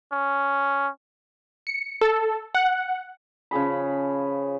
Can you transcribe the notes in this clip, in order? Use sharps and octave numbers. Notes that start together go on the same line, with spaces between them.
C#4
C#7
A4
F#5
C#3 F3 G#4 B5